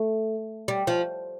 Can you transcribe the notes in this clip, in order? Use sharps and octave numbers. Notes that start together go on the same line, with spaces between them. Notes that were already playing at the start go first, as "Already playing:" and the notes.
Already playing: A3
G3
F3